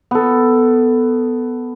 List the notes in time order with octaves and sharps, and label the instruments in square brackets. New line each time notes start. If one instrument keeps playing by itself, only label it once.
[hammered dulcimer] B3 A4